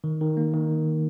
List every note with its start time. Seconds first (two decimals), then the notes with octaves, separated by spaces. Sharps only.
0.04 D#3
0.21 D#3
0.37 A#3
0.54 D#3